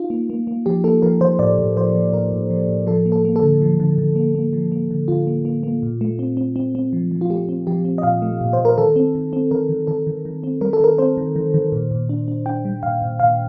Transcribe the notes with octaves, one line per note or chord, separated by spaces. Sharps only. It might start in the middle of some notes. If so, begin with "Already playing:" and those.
Already playing: D#4 F4
A#3
A#3
A#3
F3 G4
A#3 A4
F3 A#4
F3 C5
A2 D5
A2
F3 C5
F3
A2 A#4
A2
F3
A2
F3 A4
A#3
A4
A#3
A4
D3
F3
D3
D3
A#3
A#3
F3
A#3
D3
D3 F4
A#3
A#3
A#3
A#2
A3
C4
C4
C4
C4
F3
F3
F4
A3 G4
C4
F3 G4
C4
D#5
A#2 F5
A3
A#2
C5
A#2
A#4
D#3 A4
C4
D#3
C4
D#3 A#4
D#3
D#3 A4
D#3
D#3
C4
G3 A#4
A4
D#3 A#4
C4 C5
D#3
D#3
D#3
A#2
A#2
D4
D4
D4 G5
G3
A#2 F5
A#2
A#2 F5